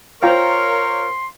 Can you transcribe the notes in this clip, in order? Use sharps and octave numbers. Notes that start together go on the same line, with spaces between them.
F4 A#4 C5 C#5 F5 G5 A#5 C6